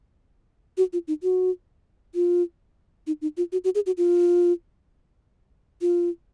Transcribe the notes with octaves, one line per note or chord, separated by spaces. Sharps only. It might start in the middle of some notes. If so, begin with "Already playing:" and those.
F#4
F4
D#4
F#4
F4
D#4
D#4
F4
F#4
F#4
G#4
F#4
F4
F4